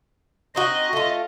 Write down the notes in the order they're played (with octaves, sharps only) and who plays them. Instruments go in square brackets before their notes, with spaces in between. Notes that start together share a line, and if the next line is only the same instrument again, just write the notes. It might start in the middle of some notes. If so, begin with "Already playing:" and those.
[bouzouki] C4 D#4 F#4 [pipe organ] D#5
[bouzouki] A3 F4